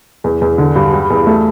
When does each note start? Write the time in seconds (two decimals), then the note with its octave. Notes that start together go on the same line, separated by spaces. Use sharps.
0.24 E2
0.41 E2
0.58 D3
0.75 G2
0.93 G3
1.10 E2
1.27 A3